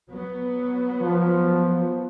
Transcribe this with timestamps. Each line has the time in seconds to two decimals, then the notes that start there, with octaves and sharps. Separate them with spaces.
0.10 F#3 B3
1.02 F3